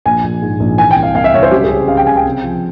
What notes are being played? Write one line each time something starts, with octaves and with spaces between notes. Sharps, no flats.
A#1 G#5
A#1
G#2
A#1
E3 G#5
G5
C2
F5
C2 F5
E5
C2 C#5
C5
C#2 G4
G#4
C#3
C#3 F5
G5
C#3 G#5
G5
C3
F3